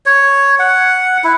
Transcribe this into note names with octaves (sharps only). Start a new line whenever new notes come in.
C#5
F#5
E4